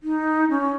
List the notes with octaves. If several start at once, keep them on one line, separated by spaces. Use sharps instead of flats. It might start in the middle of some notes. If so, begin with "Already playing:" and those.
D#4
C#4